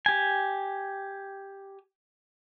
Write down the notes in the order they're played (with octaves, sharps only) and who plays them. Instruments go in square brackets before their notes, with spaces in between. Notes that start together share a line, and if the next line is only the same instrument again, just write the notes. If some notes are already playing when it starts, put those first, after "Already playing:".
[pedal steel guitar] G4 G#5